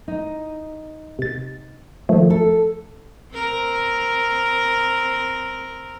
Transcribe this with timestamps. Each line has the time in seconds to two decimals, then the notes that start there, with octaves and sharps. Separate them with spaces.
0.08 D#4
1.19 C3 A6
2.09 D#3 F3 A3
2.30 A4
3.33 C4 A#4